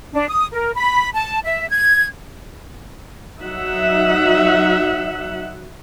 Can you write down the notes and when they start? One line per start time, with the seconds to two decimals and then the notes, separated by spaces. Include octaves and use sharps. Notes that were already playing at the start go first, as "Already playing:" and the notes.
0.13 D4
0.28 D#6
0.53 A#4
0.74 B5
1.14 A5
1.44 E5
1.69 G#6
3.41 F#3 D#4 E5 F#5